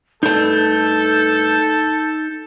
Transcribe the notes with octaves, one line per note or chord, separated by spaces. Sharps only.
G2 A3 D#4 A4 A5 G6